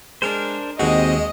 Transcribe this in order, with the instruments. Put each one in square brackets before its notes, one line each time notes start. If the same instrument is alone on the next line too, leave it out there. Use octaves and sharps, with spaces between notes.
[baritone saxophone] G#3 [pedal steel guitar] D4 A#4 C5
[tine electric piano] D#2 F#4 [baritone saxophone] G#3 [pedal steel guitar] C4 [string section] D#5